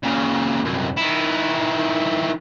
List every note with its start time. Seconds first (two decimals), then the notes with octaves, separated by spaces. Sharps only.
0.03 A#2 C#3
0.65 C2 F#2
0.97 D#3 E4